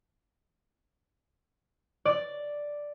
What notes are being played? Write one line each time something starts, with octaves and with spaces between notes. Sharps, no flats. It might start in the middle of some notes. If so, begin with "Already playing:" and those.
D5